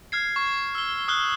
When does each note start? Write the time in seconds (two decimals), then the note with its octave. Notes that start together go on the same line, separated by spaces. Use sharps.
0.12 F6 G#6 C7
0.36 C#6
0.75 E6 G7
1.08 D#6 F6 F#6 G7